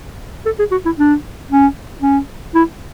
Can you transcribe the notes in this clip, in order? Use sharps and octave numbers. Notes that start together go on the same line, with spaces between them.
A4
G#4
F#4
E4
D4
C#4
C#4
E4